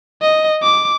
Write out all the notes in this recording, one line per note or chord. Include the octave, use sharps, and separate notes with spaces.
D#5
D6